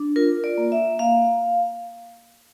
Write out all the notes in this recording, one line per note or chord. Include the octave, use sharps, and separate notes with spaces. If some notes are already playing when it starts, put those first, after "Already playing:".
Already playing: D4
F4 A#4
D5
A#3
E5
A#3 F5